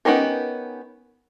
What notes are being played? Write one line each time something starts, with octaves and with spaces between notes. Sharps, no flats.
B3 C#4 D#4 G4 A#4